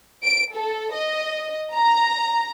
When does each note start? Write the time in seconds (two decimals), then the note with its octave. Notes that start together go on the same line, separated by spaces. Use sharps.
0.23 D7
0.54 A4
0.93 D#5
1.74 A#5